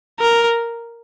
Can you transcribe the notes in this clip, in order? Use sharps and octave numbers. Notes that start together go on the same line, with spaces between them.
A#4